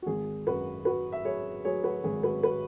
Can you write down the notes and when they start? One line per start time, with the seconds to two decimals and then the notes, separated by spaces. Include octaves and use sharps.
0.02 F#4
0.07 G#1 G#4
0.47 F#2 F#4 B4
0.85 F#3 F#4 B4
1.12 E5
1.25 F#3 G#4 C#5
1.65 F#3 G#4 C#5
1.84 F#4 B4
2.04 G#1 G#4
2.23 F#4 B4
2.43 F#4 B4